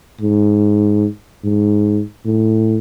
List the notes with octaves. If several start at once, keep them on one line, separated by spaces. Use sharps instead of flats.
G#2
G#2
A2